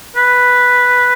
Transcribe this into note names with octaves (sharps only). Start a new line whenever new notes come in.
B4